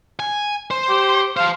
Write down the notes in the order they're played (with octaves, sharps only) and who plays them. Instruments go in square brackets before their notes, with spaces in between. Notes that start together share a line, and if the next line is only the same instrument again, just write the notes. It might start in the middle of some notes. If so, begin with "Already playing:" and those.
[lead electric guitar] G#5
C5
[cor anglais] G4
[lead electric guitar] C5 A5 [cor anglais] F5